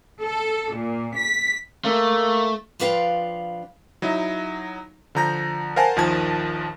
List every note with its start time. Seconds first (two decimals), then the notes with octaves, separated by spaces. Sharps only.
0.21 A4
0.76 A#2
1.16 B6
1.85 A3 A#3
2.80 F3 D4 F4 B4 F5 G5
4.02 F#3 D#4 E4
5.15 D3 F3 A#5 G6 A#6
5.76 A#4 C5 F5 F#5 G#5 A5
5.96 A#1 D#2 D#3 F3 A5 G#6